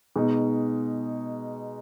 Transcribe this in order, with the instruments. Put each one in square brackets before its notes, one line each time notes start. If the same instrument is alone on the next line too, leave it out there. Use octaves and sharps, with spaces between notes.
[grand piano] B2 G#3 D#4